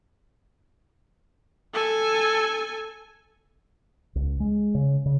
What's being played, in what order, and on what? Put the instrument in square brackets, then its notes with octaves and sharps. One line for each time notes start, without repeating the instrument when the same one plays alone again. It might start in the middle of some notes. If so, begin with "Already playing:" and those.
[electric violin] A4 G#5
[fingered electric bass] C#2
G#3
C#3
C#3